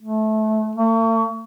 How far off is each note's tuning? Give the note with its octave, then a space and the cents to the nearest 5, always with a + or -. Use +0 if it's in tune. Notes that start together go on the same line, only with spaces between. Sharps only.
A3 -20
A3 +45